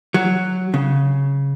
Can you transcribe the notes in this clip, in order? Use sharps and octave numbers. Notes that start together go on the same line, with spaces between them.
F#3
C#3